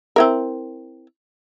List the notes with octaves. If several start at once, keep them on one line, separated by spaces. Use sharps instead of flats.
C4 E4 A#4